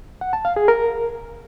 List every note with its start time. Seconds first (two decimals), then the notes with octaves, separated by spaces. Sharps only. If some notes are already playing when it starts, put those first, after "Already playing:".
0.21 F#5
0.33 A5
0.45 F5
0.56 G#4
0.68 A#4